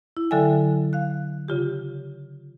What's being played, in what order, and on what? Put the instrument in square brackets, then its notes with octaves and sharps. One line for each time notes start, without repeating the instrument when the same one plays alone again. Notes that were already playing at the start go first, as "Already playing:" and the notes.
[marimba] E4
D3 F#3 A4 E5 G5 G#5
F5 F#6
C#3 F4 G4